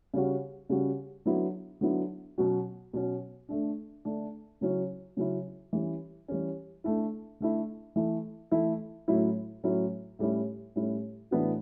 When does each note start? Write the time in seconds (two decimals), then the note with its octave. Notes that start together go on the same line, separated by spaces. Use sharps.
0.14 C#3 G3 C#4 F#4
0.69 C#3 G3 C#4 F#4
1.25 D3 F#3 B3 E4
1.81 D3 F#3 B3 E4
2.38 B2 F#3 C#4 F#4
2.93 B2 F#3 C#4 F#4
3.49 D3 A3 D4
4.05 D3 A3 D4
4.61 C#3 F#3 C#4 E4
5.17 C#3 F#3 C#4 E4
5.73 E3 G3 C#4
6.28 E3 G3 C#4
6.84 D3 A3 E4
7.40 D3 A3 E4
7.96 E3 A3 E4
8.51 E3 A3 E4
9.08 A2 F#3 C#4 E4
9.63 A2 F#3 C#4 E4
10.19 A2 G3 C#4 E4
10.76 A2 G3 C#4 E4
11.31 A2 E3 B3 D4 F#4